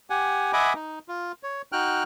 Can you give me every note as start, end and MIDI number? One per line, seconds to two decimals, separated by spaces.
0.10 0.53 67
0.10 0.53 78
0.10 0.53 80
0.53 0.73 75
0.53 0.73 76
0.53 0.73 78
0.53 0.73 80
0.53 0.73 83
0.53 0.73 86
0.75 0.99 63
1.09 1.32 65
1.43 1.62 73
1.72 2.04 63
1.72 2.04 66
1.72 2.04 79
1.72 2.04 89
1.72 2.04 90